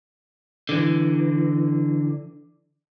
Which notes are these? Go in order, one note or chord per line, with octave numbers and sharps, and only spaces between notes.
D3 E3